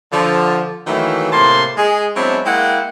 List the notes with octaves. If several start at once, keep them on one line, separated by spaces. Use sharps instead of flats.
D3 F3
D#3 E3 F#3 A3 A#3 E4
A2 C3 A#3 A5 C6
G#3 G#4
F#3 G#3 B3 C4 D4 E4
G#3 A#3 E4 F#5 G5